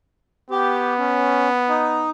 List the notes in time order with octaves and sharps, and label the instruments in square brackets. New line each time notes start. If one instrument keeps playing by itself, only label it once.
[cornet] B3 [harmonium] G4
[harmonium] C#4
D#4